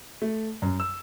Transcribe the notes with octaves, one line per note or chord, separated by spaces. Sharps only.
A3
F#2
E6